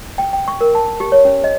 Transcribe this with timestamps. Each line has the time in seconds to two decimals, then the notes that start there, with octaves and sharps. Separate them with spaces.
0.18 G5
0.33 G5
0.48 C#6
0.61 A#4
0.75 A5
1.00 G4
1.12 C#5
1.25 C#4
1.44 D#5